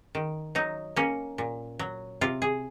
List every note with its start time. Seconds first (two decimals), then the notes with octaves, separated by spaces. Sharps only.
0.15 D#3
0.55 F#3 D#4
0.96 A#3 C#4
1.38 A#2
1.79 F#3
2.21 C3 F4
2.42 G#4